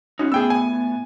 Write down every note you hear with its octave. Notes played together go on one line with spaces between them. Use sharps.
C#4 D#4 F#4
A2 B3 G#4 G5 E6
G#5